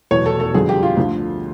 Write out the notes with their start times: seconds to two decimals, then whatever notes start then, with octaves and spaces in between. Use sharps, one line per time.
0.11 F1 E2 B2 F#3 C#5
0.26 A4
0.40 A4
0.54 G1 F2 D3 F#3 G#4
0.69 G4
0.83 F4
0.97 D2 D3 F3